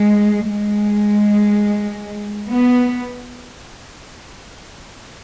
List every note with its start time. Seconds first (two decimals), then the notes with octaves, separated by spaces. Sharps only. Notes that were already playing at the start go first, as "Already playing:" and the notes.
Already playing: G#3
0.49 G#3
2.48 B3